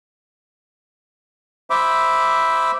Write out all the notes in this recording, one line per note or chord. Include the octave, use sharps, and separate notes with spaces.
C5 E5 B5 D6